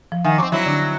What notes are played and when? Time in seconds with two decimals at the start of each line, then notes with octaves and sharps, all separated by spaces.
0.12 F3
0.24 D#3 E5 F#5 G#5
0.38 F#3 C4 C#6 D6
0.52 F#3 C4 E4 E5
0.66 D3 D4